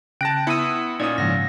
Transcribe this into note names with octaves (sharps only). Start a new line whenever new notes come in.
C#3 G5 A5 F#6 A#6 D7
B3 E4 D#6 E6 C#7 D#7
A#2 C#4 D#4 D5 D#6
G#2 C#3 F3 A#3 F#5 A#6